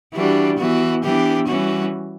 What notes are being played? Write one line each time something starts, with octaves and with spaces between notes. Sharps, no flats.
E3 G3 D4 F#4
E3 B3 F#4
E3 B3 D4 G4
E3 G3 C#4 F#4